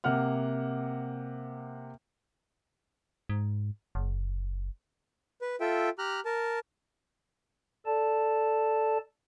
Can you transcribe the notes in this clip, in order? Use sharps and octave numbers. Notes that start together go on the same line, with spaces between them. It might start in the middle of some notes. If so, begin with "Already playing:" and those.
C3 A#3 F#5 F6
G#2
F#1
B4
F4 A4 E5 G5
G4 A#5 F6 F#6
A#4 A5
A4 D5 A5